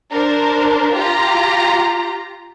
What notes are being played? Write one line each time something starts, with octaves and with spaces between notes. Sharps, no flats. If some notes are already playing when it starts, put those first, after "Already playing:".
D4 A#4 C5
F4 G4 A#5